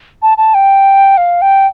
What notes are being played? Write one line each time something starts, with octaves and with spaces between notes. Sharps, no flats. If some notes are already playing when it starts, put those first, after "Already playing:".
A5
A5
G5
F5
G5